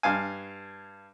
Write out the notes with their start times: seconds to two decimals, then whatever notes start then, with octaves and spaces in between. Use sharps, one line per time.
0.03 G2 F5 G#5